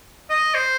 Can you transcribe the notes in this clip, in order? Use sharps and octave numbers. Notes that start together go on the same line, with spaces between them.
D#5
C5